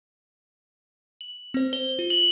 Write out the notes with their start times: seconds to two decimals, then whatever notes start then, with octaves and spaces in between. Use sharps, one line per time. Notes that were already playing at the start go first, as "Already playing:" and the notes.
1.21 F#7
1.54 C4 C5
1.73 C5 G7
1.99 F4
2.10 F#7